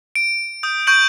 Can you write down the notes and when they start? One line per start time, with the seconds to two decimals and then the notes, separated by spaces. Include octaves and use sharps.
0.15 D7
0.63 D#6 G6
0.87 C#6 G6 D7 F#7